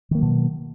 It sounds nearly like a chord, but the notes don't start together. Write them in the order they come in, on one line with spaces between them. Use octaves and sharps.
D#3 A#3 F#3 B2